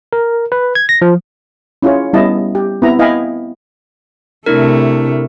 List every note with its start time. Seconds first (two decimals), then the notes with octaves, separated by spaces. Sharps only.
0.13 A#4
0.52 B4
0.75 G#6
0.89 A#6
1.02 F3
1.83 C#4 E4 F4 G#4 C#5
2.13 G3 B3 C#4 E4 D#5 A5
2.55 G4
2.82 B3 C4 E4 A#5
2.99 E4 D#5 F5 G5 G#5 B5
4.46 C3 A3 D4 E4 A#4